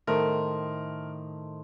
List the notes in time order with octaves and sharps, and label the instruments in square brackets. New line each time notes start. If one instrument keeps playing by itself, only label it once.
[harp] A2 D#3 [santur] A3 C5 [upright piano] A#4